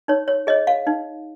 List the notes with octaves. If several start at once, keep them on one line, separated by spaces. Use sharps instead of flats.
D#4 C#5
C#5
G#4 C#5 D#5
F5
D#4